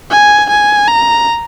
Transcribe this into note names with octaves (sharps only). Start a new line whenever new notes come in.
G#5
G#5
A#5